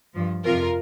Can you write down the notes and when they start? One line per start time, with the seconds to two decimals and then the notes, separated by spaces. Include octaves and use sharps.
0.15 G2 F3
0.44 F2 C3 F3 F4 A#4